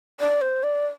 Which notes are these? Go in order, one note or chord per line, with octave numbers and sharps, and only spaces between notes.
D5
C5
D5